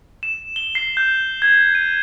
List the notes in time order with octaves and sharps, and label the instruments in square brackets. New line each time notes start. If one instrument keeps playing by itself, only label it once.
[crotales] E7
G7
C7
G6
G#6
D#7